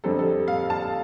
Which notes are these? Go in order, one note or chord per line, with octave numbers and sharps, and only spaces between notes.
F2 D3 G3 C4 A4
A4
F5
A5